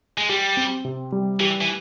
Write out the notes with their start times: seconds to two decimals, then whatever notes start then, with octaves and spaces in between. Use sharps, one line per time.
0.18 G#3
0.29 G3 G4
0.57 C4
0.85 C3
1.12 G3
1.40 E3 G4
1.61 E3